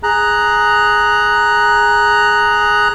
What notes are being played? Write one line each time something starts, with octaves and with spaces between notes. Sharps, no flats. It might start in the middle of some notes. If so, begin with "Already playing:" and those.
G#4 A#5 F#6